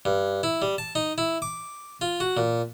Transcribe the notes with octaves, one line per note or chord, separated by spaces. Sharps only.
G2
E4
G3
A5
D#4
E4
D6
F4
F#4
A#2